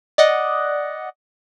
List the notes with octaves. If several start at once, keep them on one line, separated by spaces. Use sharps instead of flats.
D5 D#5 F#5